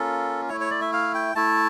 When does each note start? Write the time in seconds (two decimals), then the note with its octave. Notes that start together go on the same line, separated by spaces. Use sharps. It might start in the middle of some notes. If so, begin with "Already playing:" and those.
Already playing: A#3 C#4 F4 A4
0.49 A3 E4 C#5
0.61 C#5
0.71 D5
0.81 E5
0.93 F5
1.14 G5
1.35 A3 E4 A5